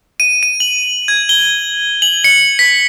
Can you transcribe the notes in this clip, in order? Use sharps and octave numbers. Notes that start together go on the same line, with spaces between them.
D#7
D#7
F#7
G#6
G7
F#7
C#7
B6